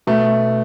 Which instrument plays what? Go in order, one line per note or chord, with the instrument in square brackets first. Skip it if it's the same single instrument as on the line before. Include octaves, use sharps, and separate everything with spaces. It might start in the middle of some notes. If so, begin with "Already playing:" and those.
[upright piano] B2 A3